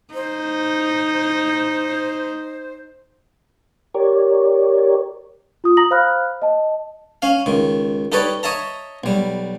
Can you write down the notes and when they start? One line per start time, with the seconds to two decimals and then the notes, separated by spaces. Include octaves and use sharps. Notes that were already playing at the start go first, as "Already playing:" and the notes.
0.14 D#4 C5
3.94 G4 A#4 C#5 D5
5.64 F4 D#6
5.77 A#5 D#6 A#6 F#7
5.91 C5 F5 A#5 B5 F6 F#6
6.42 D#5 A5
7.22 C#4 F5
7.46 C#2 D#3
8.12 D#4 G4 A4 B4 C#5 D5
8.43 C#5 D#5 E5 A5 A#5
9.04 B1 G3